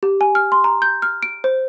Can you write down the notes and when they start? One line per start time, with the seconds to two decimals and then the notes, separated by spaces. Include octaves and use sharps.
0.03 G4
0.21 G#5
0.35 F6
0.52 C6
0.64 A#5
0.82 G6
1.02 F6
1.23 D7
1.44 C5